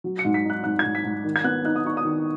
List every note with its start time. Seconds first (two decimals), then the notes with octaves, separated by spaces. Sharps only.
0.04 F#3
0.19 C#7
0.25 G#2
0.34 B6
0.45 D#4 F#6
0.64 G#2 F#6
0.79 G#2 G#6
0.95 B6
1.04 G#2
1.24 D#3
1.36 G#6
1.44 B3 F#6
1.64 D#4 F#6
1.76 D#6
1.84 D#4 C#6
1.97 D#6
2.05 D#3